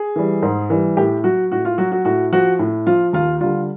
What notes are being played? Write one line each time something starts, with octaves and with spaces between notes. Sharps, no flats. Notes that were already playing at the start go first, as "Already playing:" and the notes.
Already playing: G#4
E3 G3
G#2
E3 G3
A2 G4
F#3 F#4
A2 F#4
F4
F#3 F#4
F#4
A2 F#4
F3 F#4
A2
F3 F4
D#2 F4
D3 G3 F4